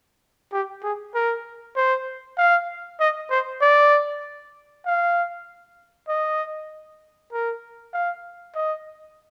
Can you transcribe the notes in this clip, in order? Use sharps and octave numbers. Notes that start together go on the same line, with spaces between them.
G4
G#4
A#4
C5
F5
D#5
C5
D5
F5
D#5
A#4
F5
D#5